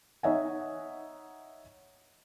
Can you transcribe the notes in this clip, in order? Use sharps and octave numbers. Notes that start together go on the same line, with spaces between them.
D#4 C#5 D#5 E5 F#5 G#5